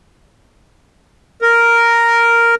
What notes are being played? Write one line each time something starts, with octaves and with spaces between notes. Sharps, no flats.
A#4